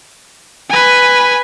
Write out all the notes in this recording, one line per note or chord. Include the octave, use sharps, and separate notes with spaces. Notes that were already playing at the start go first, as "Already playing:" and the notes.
B4 G#5